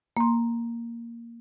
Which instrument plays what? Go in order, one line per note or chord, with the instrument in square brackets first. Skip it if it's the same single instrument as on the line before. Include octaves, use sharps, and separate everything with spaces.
[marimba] A#3 C6